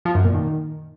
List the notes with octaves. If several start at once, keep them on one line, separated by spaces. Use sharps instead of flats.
F3
F#2
A#2
D#3